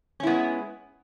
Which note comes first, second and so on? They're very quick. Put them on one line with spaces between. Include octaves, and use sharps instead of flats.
C#4 E4 B3 G#3